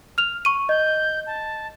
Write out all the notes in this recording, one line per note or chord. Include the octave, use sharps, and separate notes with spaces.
F6 F7
C#6 D#7
D#5 G6
A5